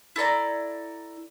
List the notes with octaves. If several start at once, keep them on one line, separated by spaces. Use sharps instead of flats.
E4 A4 D5 A#5